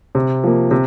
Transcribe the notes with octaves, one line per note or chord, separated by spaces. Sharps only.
C3
F3 A#3
C3